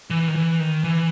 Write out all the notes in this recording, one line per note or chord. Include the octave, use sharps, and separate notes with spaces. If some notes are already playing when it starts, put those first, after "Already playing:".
E3
D#3
E3
D#3
E3